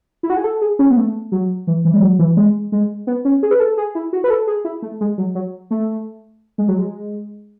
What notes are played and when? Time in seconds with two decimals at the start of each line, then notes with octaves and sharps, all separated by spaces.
0.23 E4
0.30 F#4
0.37 G#4
0.44 A4
0.61 G#4
0.79 C#4
0.90 B3
0.97 A3
1.32 F#3
1.67 E3
1.85 E3
1.94 G#3
2.02 F#3
2.19 E3
2.37 G#3
2.72 G#3
3.07 B3
3.25 C#4
3.43 G#4
3.51 B4
3.60 A4
3.77 G#4
3.95 E4
4.13 F#4
4.24 B4
4.30 A4
4.47 G#4
4.65 E4
4.82 A3
5.01 G#3
5.18 F#3
5.35 F#3
5.71 A3
6.58 G#3
6.68 F#3
6.78 G#3